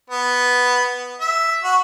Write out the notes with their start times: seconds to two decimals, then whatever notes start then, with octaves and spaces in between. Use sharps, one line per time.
0.10 B3
1.21 E5
1.63 F#4